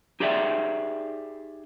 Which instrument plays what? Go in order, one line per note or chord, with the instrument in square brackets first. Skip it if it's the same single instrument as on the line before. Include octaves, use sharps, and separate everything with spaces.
[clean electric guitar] D#4 G4 G#4 D5 E5 G5